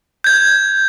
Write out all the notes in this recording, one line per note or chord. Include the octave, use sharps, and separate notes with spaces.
G6 G#6